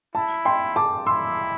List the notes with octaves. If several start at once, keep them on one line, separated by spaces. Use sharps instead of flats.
E4 A5
G5 C6
A5 D6
E4 C6 E6